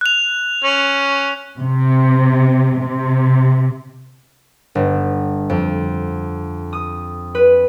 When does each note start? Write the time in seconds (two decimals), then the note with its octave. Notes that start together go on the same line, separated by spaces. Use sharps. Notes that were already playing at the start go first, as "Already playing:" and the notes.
0.01 F#6 F7
0.64 C#4
1.59 C3
2.82 C3
4.75 G1
5.50 F2
6.73 D#6
7.35 B4